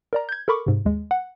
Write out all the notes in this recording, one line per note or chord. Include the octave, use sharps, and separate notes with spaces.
A#4 D5 A#5
G6 G#6
A4 A#4 B5 C#6 D6
G#2 C3
D#2 G#3
F#5